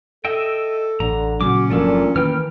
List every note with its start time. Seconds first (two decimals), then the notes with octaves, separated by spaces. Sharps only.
0.25 A4 D#5 E5 G5
1.00 A1 D3 A#5
1.41 A#2 C#3 F#3 C#4 F#4 D6
1.70 G1 A#2 F3 F#3 A3 D4 A4
2.16 D#3 E3 A#3 B4 G5 F6